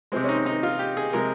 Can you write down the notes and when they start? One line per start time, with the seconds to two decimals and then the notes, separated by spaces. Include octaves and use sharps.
0.12 C3 F3 G#3 C4
0.24 C#4
0.29 D#4
0.46 D#4
0.63 F4
0.79 G4
0.97 G#4
1.13 C3 F3 G#3 A#4